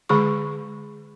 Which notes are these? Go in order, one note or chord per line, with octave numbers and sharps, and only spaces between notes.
D3 G#3 G#4 C#6